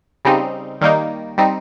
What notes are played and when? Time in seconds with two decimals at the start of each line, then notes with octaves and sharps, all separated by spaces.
0.25 C#3 G3 C4 D#4
0.81 D#3 G3 A#3 D#4
1.38 G3 C4 D#4